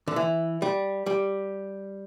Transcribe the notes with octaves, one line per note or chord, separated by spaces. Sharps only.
D3
E3
G3
G3